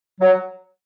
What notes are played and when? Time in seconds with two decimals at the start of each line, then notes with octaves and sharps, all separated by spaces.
0.21 F#3